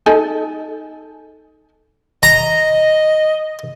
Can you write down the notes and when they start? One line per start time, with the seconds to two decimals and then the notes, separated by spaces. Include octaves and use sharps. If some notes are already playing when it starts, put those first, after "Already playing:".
0.06 D#4 A4 G#5
2.23 D#5 A#5